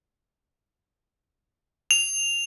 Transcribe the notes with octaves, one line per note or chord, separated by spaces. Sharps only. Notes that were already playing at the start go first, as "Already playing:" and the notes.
F7